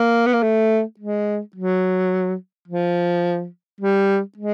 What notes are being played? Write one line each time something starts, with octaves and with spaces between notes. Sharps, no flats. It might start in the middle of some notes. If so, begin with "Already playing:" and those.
Already playing: A#3
B3
A#3
A3
G#3
F#3
F3
G3
G#3